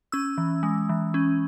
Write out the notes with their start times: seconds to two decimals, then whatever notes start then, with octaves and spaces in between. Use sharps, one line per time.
0.12 C#4 E6
0.38 E3
0.63 G#3
0.89 E3
1.14 C#4